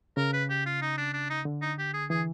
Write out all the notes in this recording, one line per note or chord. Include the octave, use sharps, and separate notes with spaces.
C#3 A#4
B4
G4
F4
D#4
D4
D4
D#4
D3
D#4
G4
G#4
E3 G#4